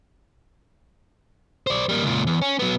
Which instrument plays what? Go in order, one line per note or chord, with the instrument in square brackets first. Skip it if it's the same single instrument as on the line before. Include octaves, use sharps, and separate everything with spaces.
[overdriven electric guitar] C5 D5
G3 A#3
C#2 A#2
E2
C#4
F#3 B3